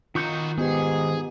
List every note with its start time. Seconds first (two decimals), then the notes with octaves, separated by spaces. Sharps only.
0.15 D#3 D#4 F4 F#4 C#6 G6
0.58 G#2 B3 G4 G#4